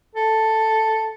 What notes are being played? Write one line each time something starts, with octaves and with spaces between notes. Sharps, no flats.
A4